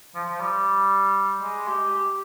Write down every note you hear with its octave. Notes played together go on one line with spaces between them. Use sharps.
F3
F3
G3
G#3
G4
G4